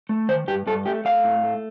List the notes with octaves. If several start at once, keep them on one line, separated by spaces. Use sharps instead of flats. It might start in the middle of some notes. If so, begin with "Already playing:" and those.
A3
D#3 C5
G2 G4
G2 A4
A3 G4
A3 F5
A2
A3